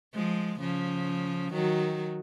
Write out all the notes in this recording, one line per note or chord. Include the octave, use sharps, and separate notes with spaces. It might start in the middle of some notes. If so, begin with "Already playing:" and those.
F3 G#3
C#3 F3
D#3 F#3